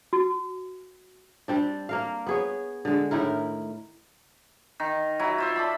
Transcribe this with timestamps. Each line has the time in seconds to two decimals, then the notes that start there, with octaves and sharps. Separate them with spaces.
0.13 F#4
1.48 G3 C4 D4
1.89 A#3 A#4 F5
2.26 B3 G#4 C#5
2.85 D3 G#3
3.11 A2 D#3 E4 A#4
4.80 D#3
5.19 F#3 E4
5.38 F4 C5 E5
5.56 A4 D5 B5